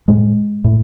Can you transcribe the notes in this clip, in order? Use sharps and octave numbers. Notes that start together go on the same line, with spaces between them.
A2 G#3
A2